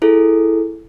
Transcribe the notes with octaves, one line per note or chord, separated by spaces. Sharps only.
E4 G#4 A4